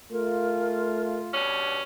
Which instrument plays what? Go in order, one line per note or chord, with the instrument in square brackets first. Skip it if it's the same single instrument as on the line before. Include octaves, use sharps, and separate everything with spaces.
[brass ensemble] A3 F4 [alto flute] A#4
[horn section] G2 B2 C#4